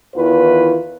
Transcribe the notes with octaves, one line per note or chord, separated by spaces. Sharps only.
E2 D#3 E3 F4 B4